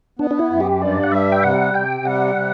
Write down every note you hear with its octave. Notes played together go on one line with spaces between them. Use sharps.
B3 D4
D4
E4
F#2
G4
G2 D5
F#5
G3 E5
G5
C3 F#5
C3 G5
G3 F#5
C3